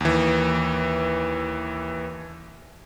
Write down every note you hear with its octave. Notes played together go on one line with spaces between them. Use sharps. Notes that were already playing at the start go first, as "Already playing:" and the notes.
D#2 E3